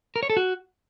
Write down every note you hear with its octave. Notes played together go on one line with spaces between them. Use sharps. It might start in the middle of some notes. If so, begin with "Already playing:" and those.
A#4
C#5
A4
F#4